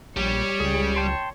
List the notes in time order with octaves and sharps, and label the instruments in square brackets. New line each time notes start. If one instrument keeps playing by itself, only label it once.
[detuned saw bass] A#1 [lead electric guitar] G3 [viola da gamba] C#5
[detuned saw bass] C#2 [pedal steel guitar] G#4
[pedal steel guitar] G5 A5 C6